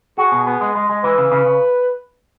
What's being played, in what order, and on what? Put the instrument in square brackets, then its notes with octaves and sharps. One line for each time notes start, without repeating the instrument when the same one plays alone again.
[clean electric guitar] F#4 [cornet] G#4
[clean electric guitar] B2
B3
G#3
G#3
G#3
[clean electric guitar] E3 [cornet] B4
[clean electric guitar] C#3
C#3
C#3